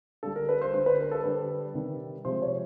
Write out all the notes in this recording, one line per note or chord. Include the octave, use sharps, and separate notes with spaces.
D3 G3 A4
A#4
B4
C5
D3 G3 C5
B4
A#4
A4
D3 G3 B4
C3 D#3 G3
C3 F3 G#3 C5
C#5